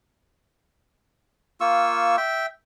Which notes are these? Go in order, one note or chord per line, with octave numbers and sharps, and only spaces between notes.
A#3 F4 C#6 E6
E5 G5